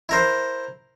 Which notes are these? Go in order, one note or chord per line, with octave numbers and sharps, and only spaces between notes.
E4 A#4 C5